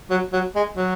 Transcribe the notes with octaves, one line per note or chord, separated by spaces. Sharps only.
F#3
F#3
G#3
F#3